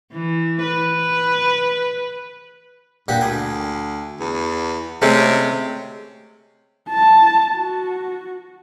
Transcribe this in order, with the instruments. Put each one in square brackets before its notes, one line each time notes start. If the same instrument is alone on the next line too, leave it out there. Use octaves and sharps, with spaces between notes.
[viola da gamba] E3
B4
[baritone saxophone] G2 [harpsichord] A#2 G4 F#5
[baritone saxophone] D2 [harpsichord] G#5
[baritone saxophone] E2
[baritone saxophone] C3 [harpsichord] G#3 A3 C#4
[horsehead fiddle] A5
F#4